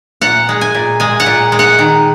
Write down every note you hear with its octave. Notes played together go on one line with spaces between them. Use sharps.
A#2 F#5
G#3
G#5
A#2
G#3 G#5
F#5
A#2
G#3
F#5
D#3